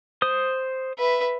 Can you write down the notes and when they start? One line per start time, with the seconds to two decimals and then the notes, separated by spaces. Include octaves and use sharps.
0.22 C5 D#6
0.98 B4 E5